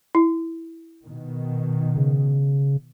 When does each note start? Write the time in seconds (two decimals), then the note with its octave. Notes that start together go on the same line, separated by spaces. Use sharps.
0.15 E4
1.05 B2 D#3
1.97 C#3